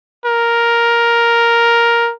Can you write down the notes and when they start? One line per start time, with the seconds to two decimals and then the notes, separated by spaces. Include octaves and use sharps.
0.26 A#4